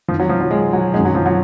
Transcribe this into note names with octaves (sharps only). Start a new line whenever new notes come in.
F2 D#3 F3
F#3
F3
F#3
G#3
F#3
F#2 D#3 G#3
F#3
F3
F#3